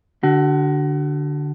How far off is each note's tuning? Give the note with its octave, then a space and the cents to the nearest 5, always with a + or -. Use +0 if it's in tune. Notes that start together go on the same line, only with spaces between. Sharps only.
D3 +0 F#4 +35